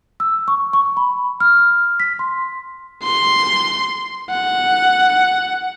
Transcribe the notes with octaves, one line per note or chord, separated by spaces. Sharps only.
E6
C#6
C#6
B5
F6
B6
C6
C6
F#5